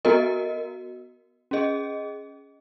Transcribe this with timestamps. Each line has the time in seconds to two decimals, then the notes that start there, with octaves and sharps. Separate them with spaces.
0.05 B3 F#4 A#4 D#5
1.51 C#4 G#4 D#5